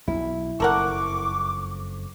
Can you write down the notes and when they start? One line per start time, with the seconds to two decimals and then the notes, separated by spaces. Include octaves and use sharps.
0.08 B1 E4
0.60 F#1 F2 A4 A#4 F#5 C#6 D6